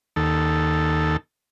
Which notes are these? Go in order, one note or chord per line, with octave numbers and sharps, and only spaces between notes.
D#2 A4